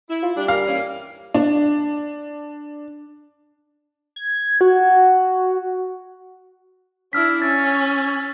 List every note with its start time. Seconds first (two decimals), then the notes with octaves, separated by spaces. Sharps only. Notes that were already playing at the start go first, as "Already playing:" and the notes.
0.10 E4
0.23 F4
0.37 G3 D4
0.48 A#4 F5
0.67 E3 A#3 C#4
1.34 D4
4.16 G#6
4.61 F#4
7.13 D4 E4 E6 F6 B6
7.42 C#4 A6